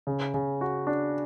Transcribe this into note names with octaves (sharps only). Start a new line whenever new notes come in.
C#3
C#3
F#4
D4